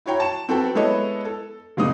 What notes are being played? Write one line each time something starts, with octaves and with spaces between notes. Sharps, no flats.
E4 F#4 C#5 G5 A#5
A5 E7
C4 F#4 A4 B4 G5 A5
G#3 B3 E4 A4 C#5 D#5
A4
F#1 A#2 G#3 C4 D#4 D#6